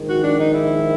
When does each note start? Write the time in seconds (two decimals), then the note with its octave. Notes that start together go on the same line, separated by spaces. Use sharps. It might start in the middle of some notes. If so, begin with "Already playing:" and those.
Already playing: A#1 G#2 D#3
0.09 F#4
0.24 D4
0.39 D#4
0.54 E4